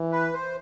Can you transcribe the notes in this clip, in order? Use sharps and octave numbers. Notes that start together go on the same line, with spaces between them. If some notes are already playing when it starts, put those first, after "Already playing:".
Already playing: E3
B4
C5